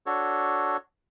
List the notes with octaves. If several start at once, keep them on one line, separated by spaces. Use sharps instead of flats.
D4 F#4 A4 C#5